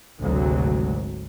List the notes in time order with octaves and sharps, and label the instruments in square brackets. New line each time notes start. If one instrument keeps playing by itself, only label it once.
[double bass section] G#1 D2 C3 F#3 G#3